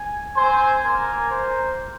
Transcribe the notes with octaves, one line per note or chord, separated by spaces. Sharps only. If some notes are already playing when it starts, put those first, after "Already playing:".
Already playing: G#5
C4 C5 G#5
A#3 A#4 G#5
C5